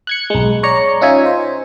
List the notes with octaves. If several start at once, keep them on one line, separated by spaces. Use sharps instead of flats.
F#6 G#6 C#7
B1 G#3
C#5 D5 A#5 C#7
C#4 D#4 F4 E5 G#5
C5